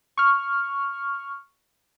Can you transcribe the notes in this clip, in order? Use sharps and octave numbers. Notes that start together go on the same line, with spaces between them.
C#6 F6